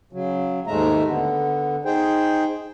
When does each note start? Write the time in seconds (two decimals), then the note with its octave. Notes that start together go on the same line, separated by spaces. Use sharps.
0.13 C#3 F#3
0.67 D#2 G#2 G#3 A3 E5 A#5
1.07 D3 B3
1.85 D#4 G#4 C5 G5